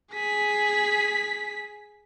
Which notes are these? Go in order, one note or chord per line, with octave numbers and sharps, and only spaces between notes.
G#4 B6